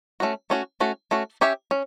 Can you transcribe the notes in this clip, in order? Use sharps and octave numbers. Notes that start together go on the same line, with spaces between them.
A3 C#4 F#4
A3 C#4 F#4
A3 C#4 F#4
A3 C#4 F#4
C#4 G4 C#5 E5
C#4